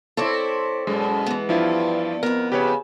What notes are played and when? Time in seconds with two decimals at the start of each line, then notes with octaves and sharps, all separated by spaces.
0.17 C4 E4 A4 C#5 D5
0.87 F#2 B2 G#3
1.26 E3 B3
1.49 G2 F3 E4 F4
2.23 F2 B3 A#4
2.52 C#3 G4 B4 C#5